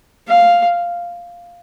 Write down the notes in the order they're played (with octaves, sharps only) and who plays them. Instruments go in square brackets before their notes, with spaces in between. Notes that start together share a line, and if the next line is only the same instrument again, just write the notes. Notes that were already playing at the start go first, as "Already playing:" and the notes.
[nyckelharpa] F5